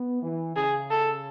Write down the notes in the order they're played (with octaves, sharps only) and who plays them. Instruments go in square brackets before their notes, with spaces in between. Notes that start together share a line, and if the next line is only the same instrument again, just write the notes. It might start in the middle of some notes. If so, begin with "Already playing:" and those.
Already playing: [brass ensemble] B3
E3
[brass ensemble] C#3 [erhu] G#4
[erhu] A4